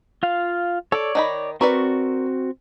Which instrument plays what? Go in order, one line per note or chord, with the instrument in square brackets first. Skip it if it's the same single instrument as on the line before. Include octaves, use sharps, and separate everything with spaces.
[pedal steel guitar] F4 F5
[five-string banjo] A4 [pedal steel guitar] C#5 D5
[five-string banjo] D#3 D#4 B5
[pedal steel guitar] C4 F#4 C#6 [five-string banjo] A#4 B4 D5